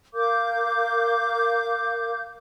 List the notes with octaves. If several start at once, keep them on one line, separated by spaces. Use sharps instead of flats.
A#4 F5 D6 G6